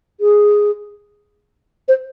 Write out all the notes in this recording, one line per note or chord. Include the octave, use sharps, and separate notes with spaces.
G#4
C5